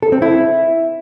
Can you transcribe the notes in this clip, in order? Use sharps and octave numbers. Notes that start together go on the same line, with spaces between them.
A4
C4
E4